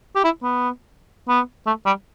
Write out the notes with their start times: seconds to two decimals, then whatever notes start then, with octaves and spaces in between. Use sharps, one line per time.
0.15 G4
0.24 E4
0.43 B3
1.29 B3
1.66 A3
1.86 G3